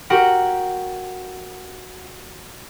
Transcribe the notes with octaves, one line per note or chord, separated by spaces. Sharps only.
F#4 G4 A#4 F#5 G5